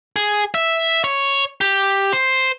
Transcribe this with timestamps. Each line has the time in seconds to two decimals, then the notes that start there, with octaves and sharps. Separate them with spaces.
0.16 G#4
0.54 E5
1.04 C#5
1.61 G4
2.13 C5